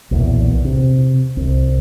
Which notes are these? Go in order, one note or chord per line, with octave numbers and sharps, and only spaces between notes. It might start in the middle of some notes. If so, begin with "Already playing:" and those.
B1 E2 A#2
C3
C2